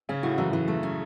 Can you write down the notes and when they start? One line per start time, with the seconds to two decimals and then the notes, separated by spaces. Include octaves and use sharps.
0.09 C#3 C#4
0.23 A2 F#4
0.38 F#2 E3
0.53 A2 E3
0.68 A3
0.83 C#4